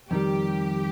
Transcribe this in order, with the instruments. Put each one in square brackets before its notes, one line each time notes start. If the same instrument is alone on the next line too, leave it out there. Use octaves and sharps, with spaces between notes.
[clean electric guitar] F2 D#3 G3 [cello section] G4